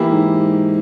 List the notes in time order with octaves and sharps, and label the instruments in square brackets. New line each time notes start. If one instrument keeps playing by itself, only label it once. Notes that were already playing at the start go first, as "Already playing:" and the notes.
Already playing: [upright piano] E3 A#3 E4 G4
[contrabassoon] G#2